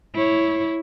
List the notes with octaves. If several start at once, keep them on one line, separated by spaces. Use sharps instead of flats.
E4 C#5